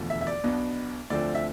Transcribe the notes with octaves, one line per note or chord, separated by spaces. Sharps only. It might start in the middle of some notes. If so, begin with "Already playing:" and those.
Already playing: E1 E2 D3 F3 A3
E5
E5
D5
B1 B2 B3 D4
D2 D3 F3 C4 D5
E5